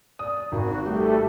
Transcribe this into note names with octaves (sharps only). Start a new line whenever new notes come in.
D5 D#6
G#1 F#4
G3 A3 G4